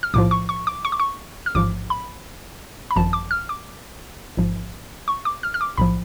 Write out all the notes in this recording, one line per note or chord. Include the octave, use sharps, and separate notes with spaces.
F6
B1 A2 F3 D6
C#6
C#6
D6
C#6
D6
C#6
F6
A1 G#2 F3 D6
B5
B5
G#1 F#2 F3 A5
D6
F6
D6
A1 G#2 F3
C#6
D6
F6
F6
D6
B1 A2 F3 B5